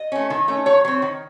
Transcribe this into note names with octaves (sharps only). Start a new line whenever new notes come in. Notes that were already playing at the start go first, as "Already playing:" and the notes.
Already playing: D#5
A3 C#4
D#3
A3 C#4
D#3 C#5
F#3 C4
D#3